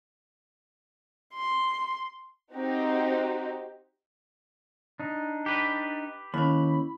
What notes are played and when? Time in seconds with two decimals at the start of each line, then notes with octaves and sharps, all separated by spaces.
1.34 C6
2.54 C4 D#4 F#4 G4
5.00 D4 D#4
5.46 G4 B4
6.34 D#2 C#4 E4 B5